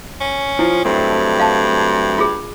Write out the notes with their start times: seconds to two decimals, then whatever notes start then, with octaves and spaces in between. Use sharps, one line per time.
0.21 C#4
0.59 F3 E4
0.85 G2 F#3 A3 C4
1.40 F5 A5
2.18 F4 G#4